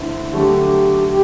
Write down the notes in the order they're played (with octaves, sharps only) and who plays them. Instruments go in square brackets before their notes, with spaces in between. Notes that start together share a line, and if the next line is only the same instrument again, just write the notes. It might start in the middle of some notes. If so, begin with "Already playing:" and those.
Already playing: [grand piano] D3 A3 C4 E4
[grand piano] D3 F#3 A3 [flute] G4
[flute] G4